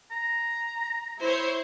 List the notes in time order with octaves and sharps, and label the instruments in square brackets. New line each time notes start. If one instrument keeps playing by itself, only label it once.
[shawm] A#5
[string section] E4 C5 C#5